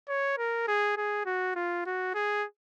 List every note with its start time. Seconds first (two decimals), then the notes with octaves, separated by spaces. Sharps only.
0.08 C#5
0.38 A#4
0.68 G#4
0.97 G#4
1.26 F#4
1.56 F4
1.86 F#4
2.14 G#4